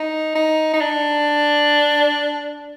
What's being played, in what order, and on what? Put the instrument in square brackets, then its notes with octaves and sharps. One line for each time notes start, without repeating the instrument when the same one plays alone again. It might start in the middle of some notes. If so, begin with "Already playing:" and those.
Already playing: [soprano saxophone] D#4
D#4
D#4
D4